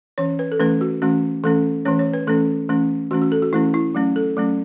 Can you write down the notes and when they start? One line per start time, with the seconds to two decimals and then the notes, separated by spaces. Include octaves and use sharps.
0.18 E3 C#4 C#5
0.39 B4
0.52 A4
0.59 E3 A3 C#4 B4
0.81 F#4
1.02 E3 A3 C#4 F#4
1.44 E3 A3 C#4 A4
1.85 E3 A3 C#4 C#5
1.99 C#5
2.13 B4
2.27 E3 A3 C#4 A4
2.69 E3 A3 C#4
3.11 E3 A3 C#4 F#4
3.22 F#4
3.32 A4
3.42 F#4
3.53 E3 A3 C#4 E4
3.74 E4
3.95 F#3 A3 C#4
4.16 A4
4.37 F#3 A3 C#4